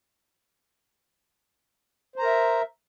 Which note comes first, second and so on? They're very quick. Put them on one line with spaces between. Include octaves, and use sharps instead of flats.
C5 A#5 A#4 E5